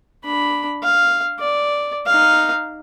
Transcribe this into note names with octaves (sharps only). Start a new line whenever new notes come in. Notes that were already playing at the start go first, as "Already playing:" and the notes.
D4 B5
F5
D5
D#4 F5